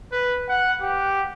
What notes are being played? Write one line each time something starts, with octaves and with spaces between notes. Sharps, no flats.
B4
F#5
G4